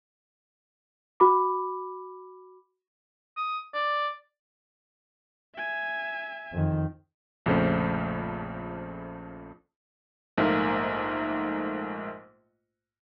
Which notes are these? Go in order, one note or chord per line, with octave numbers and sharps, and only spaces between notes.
F#4 B5 D6
D#6
D5
E5 G#5
F2 D#3
A#1 F2 C#3 F3 A3 C5
A#1 G#2 A3 A#3